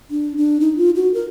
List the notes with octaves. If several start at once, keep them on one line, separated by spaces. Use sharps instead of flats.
D4
D4
D#4
F4
F#4
A#4